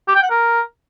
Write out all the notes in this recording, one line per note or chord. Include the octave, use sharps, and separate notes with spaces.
G4
G5
F#5
A#4